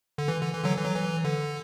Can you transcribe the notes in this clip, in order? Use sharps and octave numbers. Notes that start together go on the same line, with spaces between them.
D3
E3
D3
E3
D3 F#3
E3
F#3
E3
D3